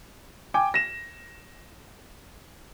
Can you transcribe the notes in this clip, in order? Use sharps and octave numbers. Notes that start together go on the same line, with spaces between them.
G5 G#5 D6
A#6 E7